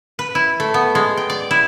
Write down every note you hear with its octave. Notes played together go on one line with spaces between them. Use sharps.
B4
E4
A3
B3
G#3
G5
D5
E4